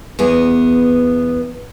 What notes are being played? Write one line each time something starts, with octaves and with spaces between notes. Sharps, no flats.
E2 B3 G#4